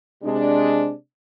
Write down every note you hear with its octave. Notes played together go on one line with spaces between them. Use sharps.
C3 G#3 D4